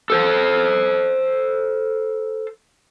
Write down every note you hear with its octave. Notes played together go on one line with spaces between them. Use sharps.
A4 C5 A5